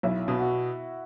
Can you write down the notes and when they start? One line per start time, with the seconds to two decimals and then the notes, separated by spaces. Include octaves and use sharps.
0.03 B1 E4
0.28 B2
0.39 F#4